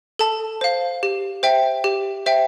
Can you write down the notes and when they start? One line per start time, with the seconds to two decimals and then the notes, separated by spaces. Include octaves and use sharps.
0.19 A4 A5
0.61 C5 F5
1.03 G4
1.43 C5 E5 G5
1.84 G4
2.26 C5 E5 G5